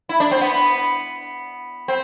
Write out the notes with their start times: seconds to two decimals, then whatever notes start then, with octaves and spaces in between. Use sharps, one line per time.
0.09 E4
0.20 D4
0.31 C4
0.41 B3
1.88 C4